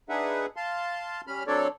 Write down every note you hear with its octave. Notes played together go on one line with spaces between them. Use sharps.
D4 D#4 G#4 B4 E5 F#5
F5 A5 C6
G3 C#4 B5 F6
F#3 C4 D4 A4 C#5 D5